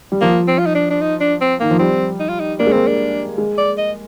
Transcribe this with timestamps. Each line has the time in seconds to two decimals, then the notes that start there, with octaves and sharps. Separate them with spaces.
0.12 G3
0.21 F3 A#3
0.48 C4
0.59 F4
0.66 D#4
0.75 D4
0.90 D4
1.01 D#4
1.21 D4
1.41 C4
1.60 D#3 A#3
1.71 F3
1.79 G3 C4
2.20 D#4
2.29 F4
2.40 D#4
2.59 A#3 D4
2.67 G#3
2.72 A#3 C4
2.87 D4
3.38 G#3
3.58 D5
3.78 D#5